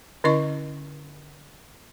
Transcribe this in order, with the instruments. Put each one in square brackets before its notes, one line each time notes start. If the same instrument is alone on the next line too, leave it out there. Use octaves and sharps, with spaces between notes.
[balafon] D3 C#4 E4 D#5 C#6